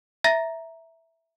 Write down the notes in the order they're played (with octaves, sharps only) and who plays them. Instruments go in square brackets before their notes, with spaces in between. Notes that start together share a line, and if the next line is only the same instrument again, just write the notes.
[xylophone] E5 A#5 A6 A#6